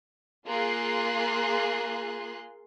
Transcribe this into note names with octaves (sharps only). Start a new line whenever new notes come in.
A#3 F4 G#4 C6 F#6